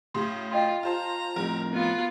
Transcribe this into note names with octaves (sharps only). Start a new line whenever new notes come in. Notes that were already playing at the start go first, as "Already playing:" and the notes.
A2 C#3 F#3 C6
F4 D#5 G5 C6
F4 C5 A5 A#5
F2 A2 F3 A#4
B3 F4